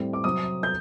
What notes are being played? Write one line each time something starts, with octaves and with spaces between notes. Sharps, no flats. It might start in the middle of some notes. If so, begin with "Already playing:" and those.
Already playing: A2 G3 C4
D6
C3 F#3 C4 D#6
G6